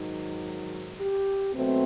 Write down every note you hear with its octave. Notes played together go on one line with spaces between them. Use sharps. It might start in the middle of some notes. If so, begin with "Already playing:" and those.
Already playing: G#2 D#3 F#3
G4
B2 F#3 A3 C4